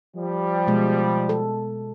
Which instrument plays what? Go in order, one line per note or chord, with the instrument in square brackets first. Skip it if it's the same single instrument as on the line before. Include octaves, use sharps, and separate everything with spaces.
[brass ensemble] F3 G3
[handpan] B2 G#3
A4